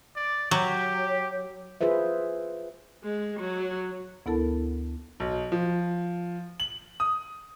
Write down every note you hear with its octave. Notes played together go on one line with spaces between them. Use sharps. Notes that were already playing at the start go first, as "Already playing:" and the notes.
D5
F#3 G4 C#5
F4 G#4 B4 C5 E5
G#3
F#3
D2 B3 E4 A4 A#4 A5
B1
F3
F#7
D#6